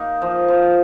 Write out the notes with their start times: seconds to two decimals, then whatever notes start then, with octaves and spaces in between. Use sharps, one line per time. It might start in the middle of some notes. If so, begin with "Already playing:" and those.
Already playing: A#3 D#4
0.22 F3
0.48 F3